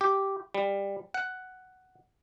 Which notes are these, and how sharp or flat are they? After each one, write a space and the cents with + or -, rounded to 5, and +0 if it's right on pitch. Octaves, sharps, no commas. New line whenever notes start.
G4 -5
G3 +15
F#5 +5